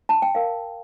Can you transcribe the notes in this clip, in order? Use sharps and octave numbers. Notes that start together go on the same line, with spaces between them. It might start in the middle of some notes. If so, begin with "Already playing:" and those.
A5
G5
A#4 F5